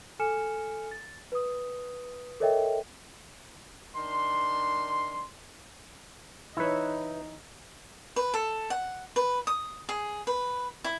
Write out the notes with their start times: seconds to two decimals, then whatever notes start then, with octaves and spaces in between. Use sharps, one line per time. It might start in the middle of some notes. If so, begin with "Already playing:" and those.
0.19 A4 G#5 F6 C#7 E7
0.91 A6
1.32 B4 D#6
2.40 A4 A#4 C#5 D#5 E5 G5
3.96 D#3 D4 C6
6.57 E3 D#4 E4 B4 C#5 E5
8.16 B4
8.34 A4
8.70 F#5
9.16 B4
9.47 D#6
9.89 G#4
10.27 B4
10.84 E4